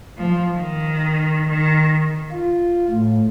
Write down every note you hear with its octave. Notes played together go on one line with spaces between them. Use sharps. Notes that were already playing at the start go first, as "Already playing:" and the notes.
F3
D#3
D#3
F4
A2